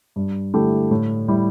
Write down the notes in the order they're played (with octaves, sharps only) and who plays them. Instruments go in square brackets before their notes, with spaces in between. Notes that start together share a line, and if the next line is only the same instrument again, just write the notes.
[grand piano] G2
D3 A3 E4 G4
A2
G3 E4 G4